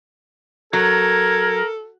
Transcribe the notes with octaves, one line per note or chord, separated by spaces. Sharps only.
F#3 A4 A#4 G#6